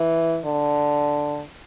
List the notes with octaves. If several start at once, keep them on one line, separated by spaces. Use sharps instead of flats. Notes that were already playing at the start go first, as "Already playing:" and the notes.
Already playing: E3
D3